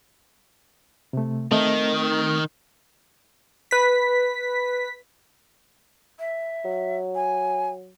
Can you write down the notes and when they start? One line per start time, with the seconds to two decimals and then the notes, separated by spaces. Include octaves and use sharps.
1.13 C3 A3
1.52 D#3 A3 C4 D#5
3.71 B4 B6
6.19 E5
6.65 F#3
7.15 G#5